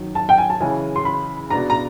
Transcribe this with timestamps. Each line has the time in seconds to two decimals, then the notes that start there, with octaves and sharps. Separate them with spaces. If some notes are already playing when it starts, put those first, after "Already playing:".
Already playing: F#2 D#3 F#3
0.15 A5
0.29 G5
0.38 G#5
0.50 A5
0.60 C#3 E3 G#3 C#4 E4 G#5
0.96 C6
1.05 B5
1.50 B2 G#3 B3 D4 A#5
1.70 A#5